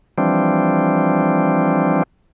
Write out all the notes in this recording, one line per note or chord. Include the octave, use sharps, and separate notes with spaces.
E3 F3 G3 C4 D4